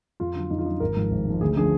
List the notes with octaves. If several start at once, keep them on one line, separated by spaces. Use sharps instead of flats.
F2 F4
D3 F#3
F2 D#4
F4
D3 F#3 D#4
G#1 A#4
G#2 F3
G#1
G#2 F3
D2 G#4
D3 F3 G#4